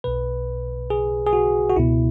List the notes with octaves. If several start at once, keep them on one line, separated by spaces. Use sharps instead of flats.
B1 B2 B4
G#4
G#4
F#4
F#4
C#2 B2 E4